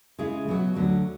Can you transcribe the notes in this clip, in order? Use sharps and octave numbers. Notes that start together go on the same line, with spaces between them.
C#3 G#3 C#4 E4 G#4
B2 F#3 B3 F#4
D2 D3 F#3